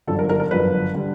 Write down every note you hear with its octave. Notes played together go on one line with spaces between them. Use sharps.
G1 F#2 D3 F3 A4
A#4
A#4
A#4
G1 F#2 D3 F3 B4
D3 G3